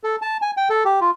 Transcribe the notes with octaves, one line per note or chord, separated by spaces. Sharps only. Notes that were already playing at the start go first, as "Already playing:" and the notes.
A4
A5
G#5
G5
A4
G4
F4